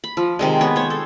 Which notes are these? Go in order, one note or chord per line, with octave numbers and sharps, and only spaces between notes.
B5
F3
C3 D#3 G#3
B3 C#5
C5 C#5
A4